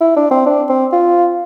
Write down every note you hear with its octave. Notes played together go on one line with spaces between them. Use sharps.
E4
D4
C4
D4
C4
F4